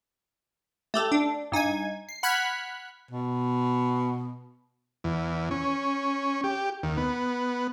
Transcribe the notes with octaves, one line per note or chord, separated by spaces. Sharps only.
A3 G4 A4
D4
G2 D#4 G#5 G#6
C7
F#5 B5 F6 F#6 G#6 B6
B2
E2
C#4
G4
D#2
B3